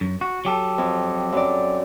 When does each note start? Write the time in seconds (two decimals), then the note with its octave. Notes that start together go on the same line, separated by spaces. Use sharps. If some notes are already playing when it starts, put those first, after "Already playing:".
0.01 F#2
0.21 F#4
0.45 F#3 G4 A4
0.78 F2
1.32 F#2 D5